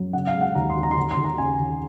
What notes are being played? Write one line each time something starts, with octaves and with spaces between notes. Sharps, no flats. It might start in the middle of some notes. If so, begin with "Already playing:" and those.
Already playing: F#2 F#3
C#3 F#5
F5
G#3
F#5
D#2 A#5
C6
D#2
A#5
C6
D#2 A#5
C6
D#2
A#5
C#3 G#5
D#2